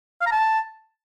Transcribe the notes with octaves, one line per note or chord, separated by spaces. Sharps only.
F5
A#5
A5